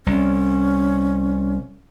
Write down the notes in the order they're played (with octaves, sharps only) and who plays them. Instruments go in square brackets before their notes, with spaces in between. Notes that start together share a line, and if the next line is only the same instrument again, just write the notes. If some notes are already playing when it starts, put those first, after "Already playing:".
[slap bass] C2 [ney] C#4